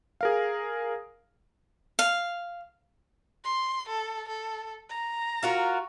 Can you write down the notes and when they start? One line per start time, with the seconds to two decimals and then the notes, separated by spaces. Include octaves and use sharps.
0.21 G#4 A#4 F5
1.99 F5
3.44 C6
3.88 A4
4.29 A4
4.89 A#5
5.43 F4 F#4 A#4